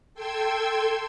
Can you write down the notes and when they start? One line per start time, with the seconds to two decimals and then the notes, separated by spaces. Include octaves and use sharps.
0.14 A4 G5 C6 E6 G#6